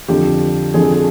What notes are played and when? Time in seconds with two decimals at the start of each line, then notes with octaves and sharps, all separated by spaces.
0.08 F2 D3 F3 G4
0.74 F2 D3 F3 G#4
0.82 A4
0.92 G#4